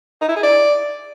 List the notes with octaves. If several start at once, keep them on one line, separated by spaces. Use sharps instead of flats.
D#4
E4
G#4
D5